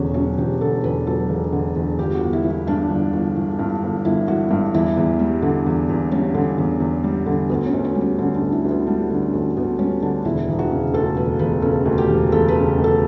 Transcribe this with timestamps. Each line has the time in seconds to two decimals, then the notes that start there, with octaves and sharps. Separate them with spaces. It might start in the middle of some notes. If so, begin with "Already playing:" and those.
Already playing: E1 E2 D3 C#4 F#4
0.14 F#3 C#4
0.37 E1 G4
0.61 D3 A4
0.84 E2 B4
1.07 F#3 A4
1.29 E1
1.52 D3
1.76 E2
1.99 G1 G4
2.15 F#4
2.21 G1
2.33 E4
2.44 E3
2.50 E4
2.67 G2 D4
2.90 G1
3.13 G1
3.36 E3
3.59 G2
3.82 G1
4.05 G1 E4
4.28 E3 F#4
4.51 G2
4.74 E2 E4
4.97 E2
5.19 G3
5.42 D3
5.66 E2
5.89 E2
6.11 G3 C#4
6.34 D3
6.58 E2
6.80 E2
7.04 G3
7.26 D3
7.49 D2 B3
7.66 C#4
7.73 D2
7.85 C#4
7.95 G3
8.01 C#4
8.19 D3 C#4
8.35 D4
8.41 D2
8.52 E4
8.65 D2
8.71 B3
8.87 G3 D4
9.10 D3
9.22 C#4
9.33 D2
9.57 D2 B3
9.79 G3 C#4
10.02 D3 D4
10.24 E1 E4
10.49 E1
10.59 F#4
10.71 C#3
10.93 D2 A4
11.16 E1 B4
11.39 E1 B4
11.62 C#3 A4
11.85 D2
11.98 G4
12.09 E1
12.32 E1 A4
12.48 B4
12.55 C#3
12.78 D2
12.84 A4